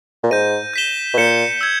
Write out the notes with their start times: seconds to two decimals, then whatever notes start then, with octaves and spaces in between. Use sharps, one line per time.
0.23 A#2
0.31 G#2 G6 A#6 D#7
0.74 G6 B6 E7 G7
1.14 B2
1.17 A#2 G6 C#7 E7
1.61 E6 G#6